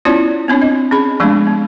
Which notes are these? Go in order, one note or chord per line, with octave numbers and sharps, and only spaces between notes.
B3 C#4 E4 F4 C#5 D5
B3 C4 D4 C#5
C4 D#5
C#4 G#4 B5
F3 G#3 A3 B3 D4
B3